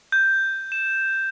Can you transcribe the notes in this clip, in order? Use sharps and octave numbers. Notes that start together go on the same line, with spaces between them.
G6
E7